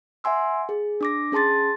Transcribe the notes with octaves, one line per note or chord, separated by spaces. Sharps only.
E5 F#5 G#5 C6 E6
G#4
D4 D6 A#6
C#4 G#4 A5 C6 A6